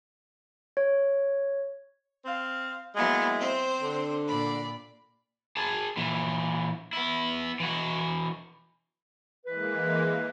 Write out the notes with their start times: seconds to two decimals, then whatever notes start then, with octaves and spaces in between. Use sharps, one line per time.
0.77 C#5
2.25 C4 F5
2.96 F#3 G#3 A#3 B3 E4
3.39 C4 C5
3.81 D3
4.27 A#2 D5 B5
5.57 G#4 A5
5.97 A#2 E3
6.93 B3 E4
7.60 E3 F#4
9.46 E3 G#3 A#3 B4